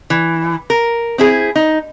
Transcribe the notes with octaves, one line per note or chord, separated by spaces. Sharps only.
E3
A#4
C4 E4 G#4
D#4